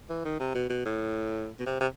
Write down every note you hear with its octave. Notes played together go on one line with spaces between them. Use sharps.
E3
D#3
C3
B2
B2
A2
B2
C3
C3